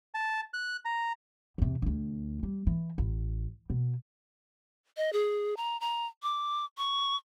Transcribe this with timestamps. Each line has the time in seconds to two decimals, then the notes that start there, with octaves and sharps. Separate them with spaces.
0.14 A5
0.54 F#6
0.85 A#5
1.58 E2 C3
1.82 D2 D3
2.43 G3
2.67 E3
2.98 A1
3.70 B2
4.97 D#5
5.13 G#4
5.57 A#5
5.80 A#5
6.23 D6
6.78 C#6